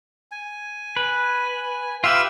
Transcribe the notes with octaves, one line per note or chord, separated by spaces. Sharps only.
G#5
B4
F4 G4 B4 E5 F5 E6